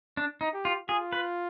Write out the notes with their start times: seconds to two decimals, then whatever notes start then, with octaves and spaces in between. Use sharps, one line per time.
0.17 D4
0.41 D#4
0.54 G4
0.65 F4
0.89 F4 G#4
1.13 B4